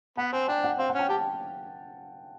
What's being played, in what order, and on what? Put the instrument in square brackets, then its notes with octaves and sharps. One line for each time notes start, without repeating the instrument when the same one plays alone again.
[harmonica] B3 [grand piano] F#5
[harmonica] C4 [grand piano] G#5
[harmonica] D4 [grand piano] G5
[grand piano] F#5
[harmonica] C4 [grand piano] F5
[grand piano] F#5
[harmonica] C#4 [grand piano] G5
[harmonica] G4 [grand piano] A5